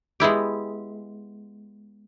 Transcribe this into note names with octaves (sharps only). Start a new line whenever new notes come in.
G#3 B3 E4 G4